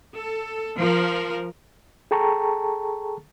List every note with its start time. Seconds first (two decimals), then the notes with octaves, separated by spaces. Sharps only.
0.16 A4
0.77 F3 A#4
2.11 G#4 A4 G5 A5 A#5 C#6